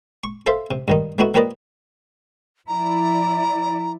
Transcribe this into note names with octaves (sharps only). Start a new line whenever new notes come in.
C#6
A4 C5 E5 F5
C3
G2 D#3 D#4
A3 B3 D#4 E4 F#4
F3 A#3 G4 B4 D5 D#5
F3 E4 D5 A#5